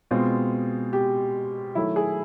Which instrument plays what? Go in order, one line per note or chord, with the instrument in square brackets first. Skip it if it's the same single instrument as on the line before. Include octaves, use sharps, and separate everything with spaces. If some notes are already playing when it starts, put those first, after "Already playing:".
[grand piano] B2 G#3 C4 F4
[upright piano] G4
[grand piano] D#3 F#3 A3 [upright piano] E4
[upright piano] G#4